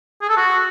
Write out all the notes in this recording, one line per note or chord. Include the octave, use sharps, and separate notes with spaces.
G#4
A4
F#4